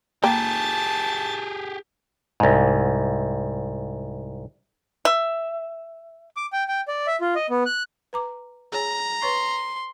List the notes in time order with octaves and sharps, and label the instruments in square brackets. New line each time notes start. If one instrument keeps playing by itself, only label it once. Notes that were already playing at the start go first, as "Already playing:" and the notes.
[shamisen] A#3 G5 [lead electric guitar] G4 G#4 [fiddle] A5
[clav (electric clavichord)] C2 G#2
[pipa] E5
[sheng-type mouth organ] D6
G5
G5
D5
E5
F4
D#5
B3
F#6
[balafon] B4 A#5 D6
[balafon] G#4 C#5 G#5 [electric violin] A#5
[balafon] B4 C#5 C#6 [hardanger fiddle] C6